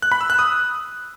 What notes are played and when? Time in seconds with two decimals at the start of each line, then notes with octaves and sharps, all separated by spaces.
0.02 F#6
0.12 B5
0.21 E6
0.30 F#6
0.39 D#6